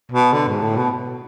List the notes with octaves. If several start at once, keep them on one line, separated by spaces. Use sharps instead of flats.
B2
D3
G#2
A2
B2